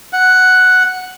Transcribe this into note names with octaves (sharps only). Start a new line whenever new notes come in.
F#5